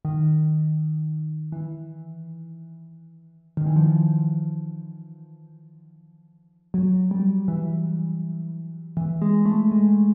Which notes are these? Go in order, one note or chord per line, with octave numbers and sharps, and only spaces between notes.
D#3
E3
D#3
E3
F3
F#3
G3
E3
E3
G#3
A3
G#3